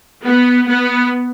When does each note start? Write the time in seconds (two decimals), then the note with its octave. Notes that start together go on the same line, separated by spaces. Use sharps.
0.24 B3
0.68 B3